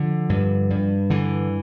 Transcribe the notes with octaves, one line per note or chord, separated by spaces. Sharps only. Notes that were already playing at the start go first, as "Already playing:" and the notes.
Already playing: D3 F3
G2
G2
D3 E3